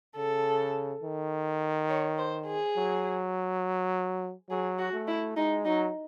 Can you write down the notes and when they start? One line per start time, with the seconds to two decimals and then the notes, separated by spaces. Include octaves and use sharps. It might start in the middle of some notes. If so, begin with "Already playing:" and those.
0.17 C#3 A4
1.03 D#3
1.89 C#5
2.18 C5
2.47 G#4
2.77 F#3
4.50 F#3 G#4
4.79 F#4
4.93 A3
5.08 E4
5.37 G#3 D#4
5.65 F#3 D#4